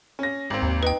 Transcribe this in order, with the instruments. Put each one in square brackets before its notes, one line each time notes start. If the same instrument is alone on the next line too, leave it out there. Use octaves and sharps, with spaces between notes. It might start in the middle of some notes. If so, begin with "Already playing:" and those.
[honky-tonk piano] C#4 A#6
G#1 C4
[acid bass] D#2
[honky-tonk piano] D#4 [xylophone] B4 G5